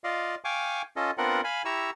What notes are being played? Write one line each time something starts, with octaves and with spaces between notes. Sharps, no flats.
F4 D5 D#5 F5
F5 G5 G#5 C#6 D6
C#4 F4 A4 D#5
B3 C4 D4 F4 A#4 F#5
F5 G#5 B5
E4 G4 A#5 C#6 E6